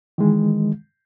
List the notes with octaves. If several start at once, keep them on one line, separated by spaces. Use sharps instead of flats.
D#3 E3 G#3